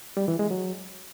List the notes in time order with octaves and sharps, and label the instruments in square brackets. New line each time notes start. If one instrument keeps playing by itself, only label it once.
[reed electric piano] G3
E3
G#3
F#3